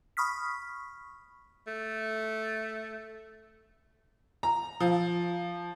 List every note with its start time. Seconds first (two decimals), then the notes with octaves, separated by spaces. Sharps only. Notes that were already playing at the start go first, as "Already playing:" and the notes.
0.17 B5 C#6 D#6 F6 B6
1.68 A3
4.43 A#5
4.80 F3